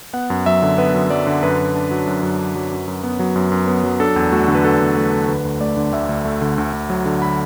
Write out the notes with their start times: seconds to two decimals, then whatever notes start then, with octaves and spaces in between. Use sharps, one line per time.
0.13 B3 F#5
0.30 F#2
0.46 F#3 E5
0.62 D3
0.78 B3 B4
0.94 F#2
1.10 F#3 D5
1.27 D3
1.43 F#2 B4
1.59 F#2
1.75 D4
1.91 F#3
2.07 F#2
2.23 F#2
2.39 D4
2.55 F#3
2.71 F#2
2.88 F#2
3.03 B3
3.19 F#3
3.35 F#2
3.52 F#2
3.68 B3
3.84 F#3
4.00 D4 A4
4.16 E2
4.32 A3 F#4
4.48 D3
4.55 B4
4.64 D4 A4
4.80 E2
4.96 A3 A4
5.12 D3
5.28 D2 B4
5.45 D2
5.60 A3 D5
5.77 D3
5.92 D2 E5
6.09 D2
6.25 A3
6.41 D3
6.58 D2
6.73 D2
6.90 F#3
7.06 D3
7.22 B5